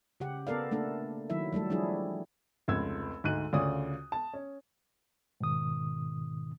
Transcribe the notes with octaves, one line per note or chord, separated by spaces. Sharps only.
C#3 G4 F#5
B3 A4 A#4 D5 F5
A3 A#3 D4 A4
D#3 F#3 E4 E5
F#3 G3 A3 A4
F3 G3 D4 E4 G#4
F1 C#2 E6 G#6
D2 G#2 D#5 F#6 D#7
D2 C#3 F4 C#5 D5 D#6
A5
C#4
G#2 B2 D#3 D#6